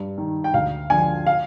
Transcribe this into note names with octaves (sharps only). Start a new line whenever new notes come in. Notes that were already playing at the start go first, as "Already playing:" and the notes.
Already playing: G2
D#3
G5
D2 F5
D3 F3 G#5
F5